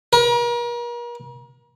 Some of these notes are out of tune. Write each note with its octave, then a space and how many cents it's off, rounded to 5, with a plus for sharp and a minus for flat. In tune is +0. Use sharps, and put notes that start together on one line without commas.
A#4 +40